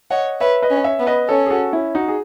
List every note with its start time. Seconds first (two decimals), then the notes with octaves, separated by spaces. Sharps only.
0.11 C#5 D#5 F#5
0.41 B4 C#5 E5
0.62 B4 D#5
0.70 C#4
0.84 C#5 E5
0.99 B3
1.07 B4 D#5
1.29 C#4 A4 C#5
1.46 G#4
1.50 F#4 A4
1.73 C#4 E4
1.95 D#4 F#4
2.08 G#4